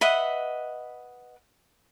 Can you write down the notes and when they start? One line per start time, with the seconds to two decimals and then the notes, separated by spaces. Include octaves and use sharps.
0.01 B4 D#5 E5 F#5